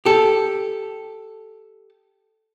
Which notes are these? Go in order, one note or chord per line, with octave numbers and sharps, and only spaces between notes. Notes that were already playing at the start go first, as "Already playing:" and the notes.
G4 A4